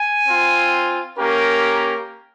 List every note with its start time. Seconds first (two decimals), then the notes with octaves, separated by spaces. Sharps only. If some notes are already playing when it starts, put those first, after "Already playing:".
Already playing: G#5
0.26 C4 F4
1.19 A#3 C#4 G4 A#4